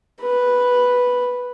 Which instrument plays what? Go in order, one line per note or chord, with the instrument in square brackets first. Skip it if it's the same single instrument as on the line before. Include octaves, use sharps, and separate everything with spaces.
[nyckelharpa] B4